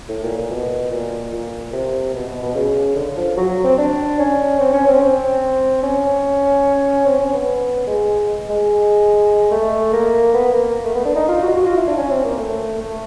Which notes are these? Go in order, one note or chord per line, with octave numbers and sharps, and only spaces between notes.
A2
A#2
A#2
B2
A#2
A#2
C3
B2
B2
B2
C#3
D3
F3
F#3
C4
D4
C#4
C4
C#4
C4
C4
C#4
C4
C#4
B3
G#3
G#3
A3
A#3
B3
A#3
A3
B3
D4
D#4
F4
F#4
F#4
F4
E4
D4
C#4
C4
A#3
A3
A3